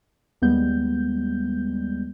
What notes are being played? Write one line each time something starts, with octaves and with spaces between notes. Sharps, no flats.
D#2 G3 G#3 B3 G6